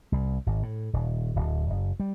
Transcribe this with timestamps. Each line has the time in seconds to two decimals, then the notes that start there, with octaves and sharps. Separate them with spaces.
0.12 C2
0.46 G#1
0.63 A2
0.93 D#1
1.36 D1
1.70 F#1
2.00 G3